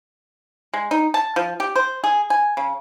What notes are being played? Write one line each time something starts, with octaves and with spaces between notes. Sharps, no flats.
G#3
D#4
A5
F3
G4
C5
G#4
G#5
C#3